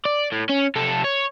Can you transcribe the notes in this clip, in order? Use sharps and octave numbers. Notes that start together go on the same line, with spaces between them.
D5
A2
C#4
C3 A4
C#5